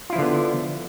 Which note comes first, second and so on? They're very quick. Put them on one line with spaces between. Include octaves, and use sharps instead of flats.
F4 E4 F3 D3 B3